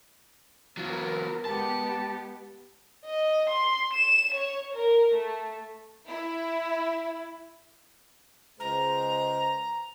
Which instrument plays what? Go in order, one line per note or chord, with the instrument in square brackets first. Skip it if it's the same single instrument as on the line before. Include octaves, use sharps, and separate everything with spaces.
[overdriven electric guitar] F#3 F4 [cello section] B3 A#4
[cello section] G#3 B3 G4 [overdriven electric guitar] A5
[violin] D#5
C6
E7
C#5
A#4
A3
[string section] E4
[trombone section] C#2 G#3 C5 [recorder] A#5